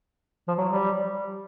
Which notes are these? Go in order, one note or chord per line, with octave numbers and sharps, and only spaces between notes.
F3
F#3
G3